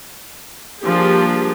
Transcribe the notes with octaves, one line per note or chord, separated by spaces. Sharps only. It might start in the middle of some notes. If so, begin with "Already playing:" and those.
F3 G3 A#3 D4 G4 G#4